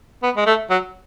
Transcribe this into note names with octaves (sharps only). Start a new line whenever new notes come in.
B3
G#3
A3
F#3